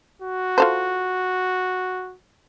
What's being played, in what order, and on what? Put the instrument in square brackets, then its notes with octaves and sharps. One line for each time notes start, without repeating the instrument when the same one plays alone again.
[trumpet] F#4
[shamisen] F4 A4 C5